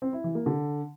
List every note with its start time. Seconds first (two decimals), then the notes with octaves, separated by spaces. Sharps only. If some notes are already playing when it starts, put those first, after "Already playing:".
0.02 C4
0.13 E4
0.24 E3
0.35 A#3
0.46 D3